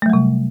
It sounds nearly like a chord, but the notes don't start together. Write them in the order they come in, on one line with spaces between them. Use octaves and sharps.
A3 F#3 G3 C3